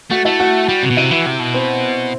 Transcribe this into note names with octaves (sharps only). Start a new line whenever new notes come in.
A3 F#4
A3 E4
F#4
G3
C3
B2
C3 E4
E3
C3
B2
C4